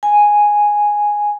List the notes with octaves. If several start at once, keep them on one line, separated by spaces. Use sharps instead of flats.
G#5